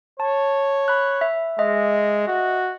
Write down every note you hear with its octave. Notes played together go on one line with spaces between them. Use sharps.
C#5 A5
B5 F#6
E5
G#3 D#5 E5
F#4